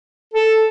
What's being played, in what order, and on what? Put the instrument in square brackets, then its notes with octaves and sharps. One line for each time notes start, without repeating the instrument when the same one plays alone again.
[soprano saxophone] A4